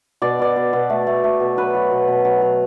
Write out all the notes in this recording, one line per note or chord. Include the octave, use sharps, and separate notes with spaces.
B2 D5
B2 D5
B2
B2
A3
A3
A3
B2
F#3 B4
F#3
B2
B2
F#3
F#3